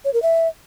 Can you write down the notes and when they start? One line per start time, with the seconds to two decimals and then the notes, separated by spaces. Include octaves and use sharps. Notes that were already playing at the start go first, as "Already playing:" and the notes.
0.05 C#5
0.14 A#4
0.22 E5